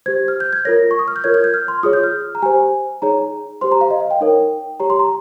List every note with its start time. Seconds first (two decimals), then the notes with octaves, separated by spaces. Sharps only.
0.06 G4 C5 G#6
0.28 F6
0.40 G6
0.53 G#6
0.65 F4 A#4 C#5 A#6
0.91 C#6
0.99 D#6
1.08 F6
1.16 G6
1.24 F4 A#4 C#5 G#6
1.34 G#6
1.44 G6
1.54 F6
1.68 C6
1.83 F4 G#4 C#5 D#6
1.93 G6
2.04 F6
2.35 A#5
2.42 G4 C5 G#5
3.02 D#4 G#4 C#5 A#5
3.61 G4 C5 C6
3.72 A#5
3.81 F5
3.91 D#5
4.00 F5
4.11 G5
4.21 D#4 A#4 C#5
4.80 G4 C#5 A#5
4.90 C6
4.99 A#5